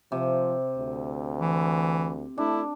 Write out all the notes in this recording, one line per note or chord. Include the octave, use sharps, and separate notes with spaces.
C3 F3
D2
E3
A3 D4 E4